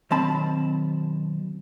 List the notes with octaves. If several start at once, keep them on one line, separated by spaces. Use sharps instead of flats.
B1 B2 D#3 C4 A5 B5